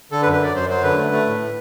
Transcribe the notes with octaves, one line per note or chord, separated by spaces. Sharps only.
D3 A4
B4
F#2
B4
F#3 D5
F#2 C5
F#3 C5
D3 B4
A3
A3
A2
A2